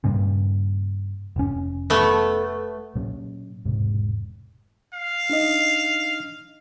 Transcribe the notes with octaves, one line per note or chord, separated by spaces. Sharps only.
G2 A#2 C#3
F1 C#4
A3 B3
A#2 F#3 A#3 C#4
E1 G#2 C3
F5
D4 D#4 D#5